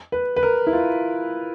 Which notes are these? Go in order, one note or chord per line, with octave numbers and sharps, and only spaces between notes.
B4
B4
A#4
E4
F4